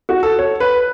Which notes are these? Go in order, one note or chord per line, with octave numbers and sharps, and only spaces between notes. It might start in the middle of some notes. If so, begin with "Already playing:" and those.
F#4
A4
C#5
B4